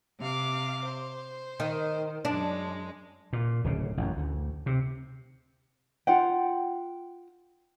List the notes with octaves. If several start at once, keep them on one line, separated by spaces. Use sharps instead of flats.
C3 F5 D6
C5
D#3
F#2 G#3 D4
A#2
D1 C#3
A1 F#2
D2
C3
F4 F#5 G5